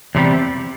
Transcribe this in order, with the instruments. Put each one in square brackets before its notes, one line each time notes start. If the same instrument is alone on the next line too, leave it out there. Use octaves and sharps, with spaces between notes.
[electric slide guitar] E2 C3 G3